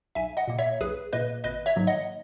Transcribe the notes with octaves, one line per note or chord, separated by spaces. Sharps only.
B1 E5 G#5
D#5 F#5
A#2 A#3
C#5 E5
B1 G#4 B4
A#2 A#3 B4 D#5
G#1 B4 D#5
C#5 E5
G#2 D#3 F#3 A#3
D#5 F#5